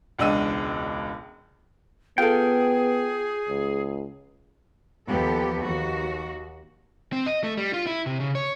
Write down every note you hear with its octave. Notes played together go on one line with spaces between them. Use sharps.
E1 C#2 D4 D#5 E6 D#7
B3 F4 G#4 A4 G5
C#2
D#2 F3 B3 G4 A4
D#2 F#4
C4
D#5
A3
G3
F4
E4
C3
C#3
C#5